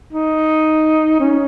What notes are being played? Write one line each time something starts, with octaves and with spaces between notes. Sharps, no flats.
D#4
C#4